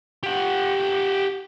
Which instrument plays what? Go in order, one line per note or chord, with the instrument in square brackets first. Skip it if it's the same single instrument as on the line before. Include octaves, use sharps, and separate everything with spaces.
[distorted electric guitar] G4 F#5